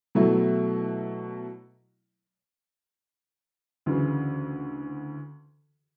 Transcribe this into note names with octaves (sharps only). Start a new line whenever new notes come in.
B2 F#3 A3 E4
D2 C#3 E3